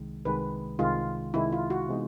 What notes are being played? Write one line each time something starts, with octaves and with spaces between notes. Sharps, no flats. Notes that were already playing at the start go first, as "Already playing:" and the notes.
Already playing: C2 C3 D#3 G#3
C2 C3 D#3 G#3 B4
C2 C3 D#3 G#3 F4
C2 C3 D#3 G#3 E4
F4
F#4
C3 E3 G#3 B3 D#4